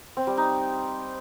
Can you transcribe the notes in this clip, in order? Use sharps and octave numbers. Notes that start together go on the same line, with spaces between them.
C4
G3
D#4